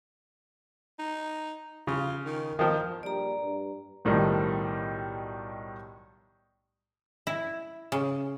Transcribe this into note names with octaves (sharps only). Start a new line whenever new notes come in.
D#4
C#3 F4
D#3
D#3 F3 A#3
A#1 G3 D5 A#5
G2
B1 A2 D#3 F3 G3
E4
C#3